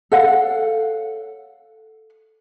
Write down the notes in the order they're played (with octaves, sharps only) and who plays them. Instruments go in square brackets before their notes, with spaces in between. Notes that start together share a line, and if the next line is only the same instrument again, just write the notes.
[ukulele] A4 C#5 F5 F#5